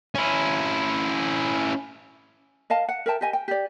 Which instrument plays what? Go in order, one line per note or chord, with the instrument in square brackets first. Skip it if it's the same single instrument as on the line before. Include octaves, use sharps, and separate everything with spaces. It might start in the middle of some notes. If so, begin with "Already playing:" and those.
[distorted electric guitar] C#4 E4
[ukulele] A#4 D#5 F5 A5
F#5
A#4 E5 G5 A5
G4 D#5 G#5
G5
G4 D5